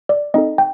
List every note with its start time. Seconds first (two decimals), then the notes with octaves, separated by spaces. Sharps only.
0.09 D5
0.34 C4 D#4 A4 D#5
0.58 G5